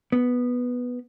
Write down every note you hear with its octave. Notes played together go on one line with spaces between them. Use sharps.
B3